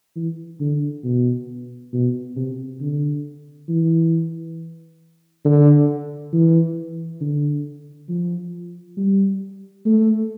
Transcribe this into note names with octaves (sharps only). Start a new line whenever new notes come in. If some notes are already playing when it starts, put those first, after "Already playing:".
E3
D3
B2
B2
C3
D3
E3
D3
E3
D3
F3
G3
A3